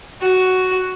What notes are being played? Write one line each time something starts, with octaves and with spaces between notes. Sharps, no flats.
F#4